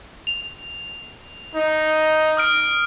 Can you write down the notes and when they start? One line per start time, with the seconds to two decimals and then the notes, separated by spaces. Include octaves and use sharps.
0.27 F7
1.55 D#4
2.37 D#6 F6 D7